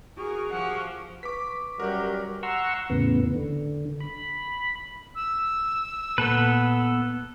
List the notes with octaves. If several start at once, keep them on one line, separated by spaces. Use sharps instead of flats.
F#4 G#4 A#4 C#6
F3 G4 F#5
B4 C#6 D6 B6
F#2 F#3 G3 G4 A#4
F#5 A#5 C6 C#6 E6
E2 A2 C#3 B3
D3
B5
E6
A#2 B3 A4 B4